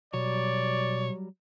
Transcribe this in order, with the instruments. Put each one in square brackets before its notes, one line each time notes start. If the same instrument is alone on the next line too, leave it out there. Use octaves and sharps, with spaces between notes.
[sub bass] B2 [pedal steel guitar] F#3 G3 [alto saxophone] C#5 [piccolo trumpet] D5